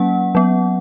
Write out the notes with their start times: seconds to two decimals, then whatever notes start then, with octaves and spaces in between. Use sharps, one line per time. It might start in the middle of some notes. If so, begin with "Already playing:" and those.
Already playing: F#3 A#3 C#4 F#5
0.35 F#3 B3